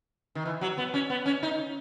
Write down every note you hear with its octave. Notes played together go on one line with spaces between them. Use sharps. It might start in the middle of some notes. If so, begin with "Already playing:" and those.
D#3
E3
F#3
B3
C#4
B3
C#4
D#4